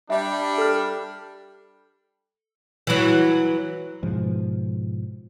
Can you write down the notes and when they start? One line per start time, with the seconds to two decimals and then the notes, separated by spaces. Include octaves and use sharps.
0.10 G3 D4 E5
0.58 A4 F6
2.87 E3 F#3
4.03 G#2 B2 F3 G#3